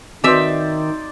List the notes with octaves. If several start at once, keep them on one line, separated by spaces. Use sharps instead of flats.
D#3 C4 D#4 F#4 B4 C5 D5 E5